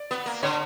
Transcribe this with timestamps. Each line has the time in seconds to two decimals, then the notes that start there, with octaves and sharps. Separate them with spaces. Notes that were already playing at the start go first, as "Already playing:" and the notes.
Already playing: D5
0.11 B3
0.26 A#3
0.43 D3 C#5